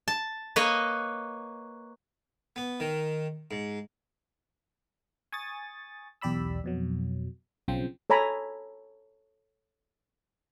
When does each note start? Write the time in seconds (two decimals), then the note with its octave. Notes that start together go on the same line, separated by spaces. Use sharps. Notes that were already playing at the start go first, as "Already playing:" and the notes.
0.08 A5
0.56 A#3 B4 C#5 D#5
2.56 B3
2.80 D#3
3.51 G#2
5.32 G#5 C#6 D#6 A6
6.22 B1 E2 G4 D5 B5 E6
6.64 F2 B2 F#3
7.68 B1 C#3 F3 C4 G5
8.10 A4 C#5 G#5 A#5 B5